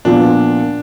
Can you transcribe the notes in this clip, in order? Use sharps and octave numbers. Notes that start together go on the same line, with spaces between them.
A#2 F3 B3 D4